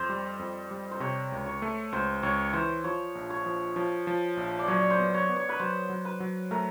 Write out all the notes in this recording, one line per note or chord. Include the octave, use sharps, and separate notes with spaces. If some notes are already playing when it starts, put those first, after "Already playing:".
Already playing: F2 C5
G3
F2
G3
C5
C3 C#5
C#2
C#5
A3
C#2 C5
C#2 C#5
E3 C5
F3 C#5
A#1
C#5
F3
F3 C#5
F3
A#1
D5
F#3 C#5
C5
B3
C#5
B3
C#5
B4
F#3 C5
F#3
B4
F#3
A3 A#4